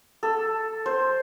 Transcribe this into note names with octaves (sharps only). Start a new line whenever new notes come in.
A4
C5